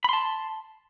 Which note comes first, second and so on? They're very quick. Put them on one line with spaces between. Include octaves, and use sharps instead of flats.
B5 C6 A5